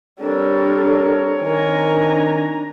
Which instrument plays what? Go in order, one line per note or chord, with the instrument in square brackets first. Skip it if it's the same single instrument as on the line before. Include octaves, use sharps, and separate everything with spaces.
[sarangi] G3 [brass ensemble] C4 A#4 C#5 [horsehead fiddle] D4 A4
[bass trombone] D#3 [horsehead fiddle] D4 A#5 [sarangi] G#5